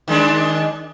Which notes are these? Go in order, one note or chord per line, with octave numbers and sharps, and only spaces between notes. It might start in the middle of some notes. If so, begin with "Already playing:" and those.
D#3 G#3 D4